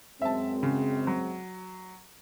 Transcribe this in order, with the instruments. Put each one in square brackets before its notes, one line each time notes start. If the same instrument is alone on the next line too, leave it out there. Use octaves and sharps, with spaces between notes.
[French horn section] F#2 G#3 C4 [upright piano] E5 A5
[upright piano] C#3
F#3